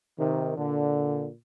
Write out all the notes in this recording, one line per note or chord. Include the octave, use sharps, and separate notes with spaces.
C3 D#3
A#2 D3